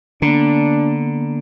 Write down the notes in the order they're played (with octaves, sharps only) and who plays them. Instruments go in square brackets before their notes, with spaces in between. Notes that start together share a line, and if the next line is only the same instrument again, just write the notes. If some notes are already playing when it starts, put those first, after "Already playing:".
[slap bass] D3 [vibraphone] A#3 B3 [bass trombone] D4